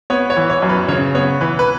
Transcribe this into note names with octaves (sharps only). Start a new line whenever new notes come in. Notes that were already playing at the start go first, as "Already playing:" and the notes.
B3 C#5
C#5
E3
C#5
F#2
B4
C#3 C#5
B3 C#5
E3 B4
B4